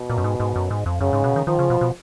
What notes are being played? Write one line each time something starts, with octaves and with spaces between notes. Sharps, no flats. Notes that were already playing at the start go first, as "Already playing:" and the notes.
Already playing: B2
A#2
F#2
G#2
G#2
F#2
G#2
F2
F#2 C#3
G#2
B2
D#3
D#3 F3
C#3
B2
B2